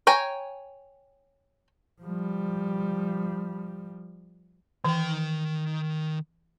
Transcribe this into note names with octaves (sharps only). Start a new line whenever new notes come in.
C#5 G5 G#5 A#5
F3 G3
D#3 E3 G5